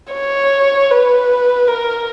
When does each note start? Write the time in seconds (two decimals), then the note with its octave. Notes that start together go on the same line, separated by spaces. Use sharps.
0.13 C#5
0.91 B4
1.68 A#4